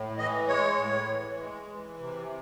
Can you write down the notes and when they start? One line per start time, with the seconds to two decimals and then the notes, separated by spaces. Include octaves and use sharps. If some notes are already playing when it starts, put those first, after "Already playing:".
Already playing: A2
0.17 E3 D#5
0.47 G#3 C#5
0.77 A2
1.08 E3
1.37 G#3
1.69 E3
1.98 C3